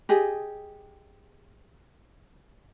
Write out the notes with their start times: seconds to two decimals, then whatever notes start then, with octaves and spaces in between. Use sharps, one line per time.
0.09 G4 G#4 D#5